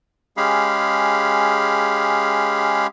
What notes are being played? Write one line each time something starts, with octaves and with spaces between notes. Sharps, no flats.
G#3 C#4 G4 G#4 F5 B5